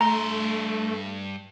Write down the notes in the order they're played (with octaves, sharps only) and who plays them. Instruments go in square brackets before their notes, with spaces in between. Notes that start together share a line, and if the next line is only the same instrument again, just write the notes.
[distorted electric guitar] G2 C6 [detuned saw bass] A3 [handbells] A#5